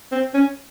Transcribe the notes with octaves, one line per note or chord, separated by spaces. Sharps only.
C4
C#4